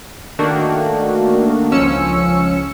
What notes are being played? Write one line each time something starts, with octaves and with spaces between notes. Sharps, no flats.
D#3 A3 A#3 D4 F#4
C#2 F3 C#4 E6 C#7